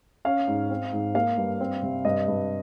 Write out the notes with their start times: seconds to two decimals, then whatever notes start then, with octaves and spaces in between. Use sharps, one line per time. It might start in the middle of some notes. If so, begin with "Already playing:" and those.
0.25 C#4 F5
0.48 G#2
0.70 C4
0.93 G#2
1.15 A#3 F5
1.37 G2
1.60 C4
1.82 C3
2.05 G2 D#5
2.28 G2